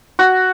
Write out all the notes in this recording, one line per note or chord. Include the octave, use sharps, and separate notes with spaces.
F#4